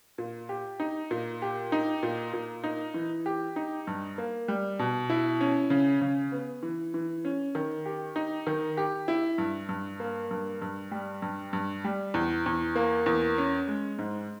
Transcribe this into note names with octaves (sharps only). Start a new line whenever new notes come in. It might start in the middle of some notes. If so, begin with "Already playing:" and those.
A#2
G4
D#4
A#2
G4
D#4
A#2
A#2
D#4
E3
G4
D#4
G2
A#3
G3
B2
E4
C#4
C#3
C#3
B3
E3
E3
C#4
D#3
G4
D#4
D#3
G4
E4
G2
G2
A#3
G2
G2
G3
G2
G2
G3
E2
E2
A#3
E2
C#4
G#3
G#2